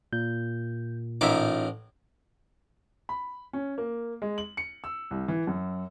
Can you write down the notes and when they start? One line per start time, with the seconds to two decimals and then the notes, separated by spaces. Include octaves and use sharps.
0.13 A#2 G6
1.21 A1 D#4 F4 A#4 E5 D6
3.09 B5
3.53 C#4
3.78 A#3
4.22 G#3
4.38 F#7
4.57 C#7
4.84 E6
5.11 C2
5.28 E3
5.47 F#2